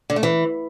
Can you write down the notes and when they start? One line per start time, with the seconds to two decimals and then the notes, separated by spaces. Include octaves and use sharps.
0.10 D3
0.16 A3
0.23 E3